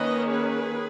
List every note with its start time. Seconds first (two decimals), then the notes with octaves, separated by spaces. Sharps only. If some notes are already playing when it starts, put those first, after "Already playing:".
Already playing: D#3 A#3 C#4 B4 D#5
0.32 G#4 B4